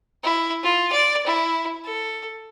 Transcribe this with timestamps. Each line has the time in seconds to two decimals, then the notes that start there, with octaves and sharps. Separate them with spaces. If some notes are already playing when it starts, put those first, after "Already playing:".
0.24 E4
0.63 F4
0.92 D5
1.26 E4
1.84 A4